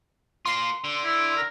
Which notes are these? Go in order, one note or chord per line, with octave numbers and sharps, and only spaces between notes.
A#3 F4 C6
D3
E4
A#4